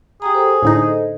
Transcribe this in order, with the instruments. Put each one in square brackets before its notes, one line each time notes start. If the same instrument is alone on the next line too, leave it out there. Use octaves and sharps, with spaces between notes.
[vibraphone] G4 G5 A#5 [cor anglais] G#4
[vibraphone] A4 C5
[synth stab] A2 D3 D#4